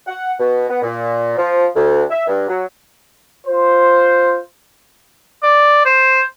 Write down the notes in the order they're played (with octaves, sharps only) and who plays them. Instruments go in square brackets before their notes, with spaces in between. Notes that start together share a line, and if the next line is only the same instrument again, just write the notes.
[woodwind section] F#5
B2
B3
A#2
F3
D2
E5
G2
F#3
[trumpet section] F4 C5
[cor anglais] D5
C5